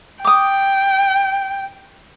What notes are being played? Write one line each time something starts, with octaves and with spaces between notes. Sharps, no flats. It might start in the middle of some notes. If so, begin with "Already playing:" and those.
G5 D6 D#6